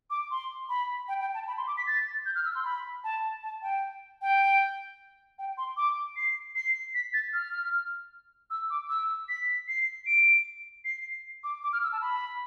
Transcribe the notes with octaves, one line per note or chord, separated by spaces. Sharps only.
D6
C6
B5
G5
G5
A5
B5
C6
D6
B6
A6
G6
F6
E6
C6
B5
A5
A5
G5
G5
G5
C6
D6
C7
C7
B6
A6
F6
E6
D6
E6
B6
C7
D7
C7
D6
D6
F6
E6
A5
B5